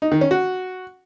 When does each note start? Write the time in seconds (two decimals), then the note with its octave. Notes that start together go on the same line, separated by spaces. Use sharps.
0.02 D#4
0.12 D#3
0.21 C#4
0.31 F#4